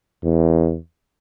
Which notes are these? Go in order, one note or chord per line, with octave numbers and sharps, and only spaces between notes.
E2